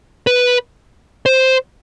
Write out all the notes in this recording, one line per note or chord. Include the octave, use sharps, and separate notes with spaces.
B4
C5